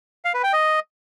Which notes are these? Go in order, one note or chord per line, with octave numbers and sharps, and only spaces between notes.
F5
B4
G5
D#5